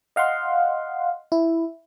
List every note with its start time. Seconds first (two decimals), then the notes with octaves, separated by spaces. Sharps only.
0.16 D#5 F5 F#5 C6
1.32 E4